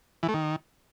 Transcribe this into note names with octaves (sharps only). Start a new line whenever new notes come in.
E3
A3
D#3